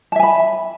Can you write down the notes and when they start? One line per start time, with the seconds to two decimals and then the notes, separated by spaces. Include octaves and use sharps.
0.12 A5
0.16 E5
0.19 G#5
0.23 B5